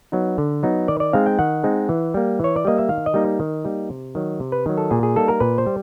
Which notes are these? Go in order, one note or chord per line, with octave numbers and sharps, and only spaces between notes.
F#3 B3 D#4
D3
F#3 B3 D#4
D#3 D5
D5
G#3 C4 D#4 F5
G5
D#3 F#5
G#3 C4 D#4
E3
G3 A#3
E3 C#5
D5
G3 A#3 D#5
E5
D#3 F5
D#5
G3 A#3 D#4
D#3
G3 A#3 D#4
C3
D#3 F#3
C3
B4
D#3 F#3
A4
A#2 G#4
G#4
G3 A#3 D#4 A4
A#4
A#2 B4
C5
G3